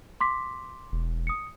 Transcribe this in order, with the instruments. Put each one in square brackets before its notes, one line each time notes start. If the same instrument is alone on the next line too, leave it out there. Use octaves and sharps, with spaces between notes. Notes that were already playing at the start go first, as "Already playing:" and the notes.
[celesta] C6 D6 B6
[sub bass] E1
[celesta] D#6 C#7